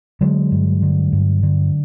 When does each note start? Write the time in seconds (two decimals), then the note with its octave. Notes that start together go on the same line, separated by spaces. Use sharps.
0.21 D3 F#3 G#3
0.52 G2
0.82 D3
1.12 G2
1.43 D3